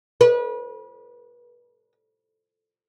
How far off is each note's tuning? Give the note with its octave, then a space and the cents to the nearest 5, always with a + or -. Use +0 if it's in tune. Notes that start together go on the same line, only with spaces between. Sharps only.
B4 -35